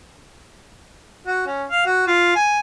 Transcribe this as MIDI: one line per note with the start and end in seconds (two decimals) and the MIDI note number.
1.27 1.45 66
1.47 1.64 61
1.69 1.82 77
1.86 2.07 66
2.07 2.33 65
2.35 2.59 80